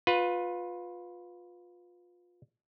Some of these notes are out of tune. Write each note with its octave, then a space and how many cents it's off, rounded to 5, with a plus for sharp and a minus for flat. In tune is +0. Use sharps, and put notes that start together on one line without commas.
F4 +25 B4 +0